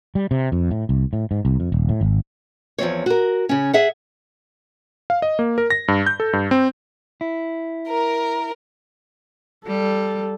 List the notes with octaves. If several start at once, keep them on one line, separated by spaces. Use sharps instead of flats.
G3
C3
F2
A2
C2
A2
G#2
C2
F2
D#1
A2
G#1
E2 F3 C4 C#5
F#4 A#4
C#3 C#4
G#4 E5 F#5
F5
D#5
A#3
A#4
A#6
G2
G6
A4
G2
C4
E4
A#4
G3 A4